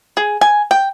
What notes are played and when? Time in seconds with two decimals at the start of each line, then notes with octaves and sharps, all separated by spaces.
0.17 G#4
0.41 G#5
0.71 G5